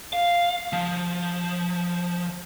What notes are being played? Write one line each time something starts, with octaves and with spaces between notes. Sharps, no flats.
F5
F3